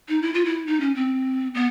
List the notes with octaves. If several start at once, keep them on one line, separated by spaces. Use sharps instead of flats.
D#4
E4
F4
E4
D#4
C#4
C4
B3